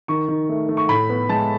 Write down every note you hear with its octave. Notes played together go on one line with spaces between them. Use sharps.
D#3 C#6
D#3
A3
A3
C#6
A2 B5
B3
G#3 A5